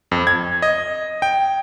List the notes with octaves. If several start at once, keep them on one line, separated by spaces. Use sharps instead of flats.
F2
G#6
D#5
G5